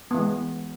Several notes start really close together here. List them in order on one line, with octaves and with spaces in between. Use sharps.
B3 E3 G#3